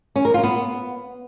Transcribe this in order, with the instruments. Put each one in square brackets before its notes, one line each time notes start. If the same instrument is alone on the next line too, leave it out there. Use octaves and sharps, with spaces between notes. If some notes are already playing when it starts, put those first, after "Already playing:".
[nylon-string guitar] C#4
A#4
F4
B3